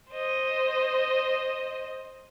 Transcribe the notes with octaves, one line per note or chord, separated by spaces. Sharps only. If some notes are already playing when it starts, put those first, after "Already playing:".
C5 D#5